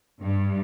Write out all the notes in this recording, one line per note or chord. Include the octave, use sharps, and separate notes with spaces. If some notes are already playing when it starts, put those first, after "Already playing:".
G2